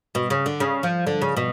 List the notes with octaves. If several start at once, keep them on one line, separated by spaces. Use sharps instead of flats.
B2
C#3
D3
C#3
F3
D3
C#3
B2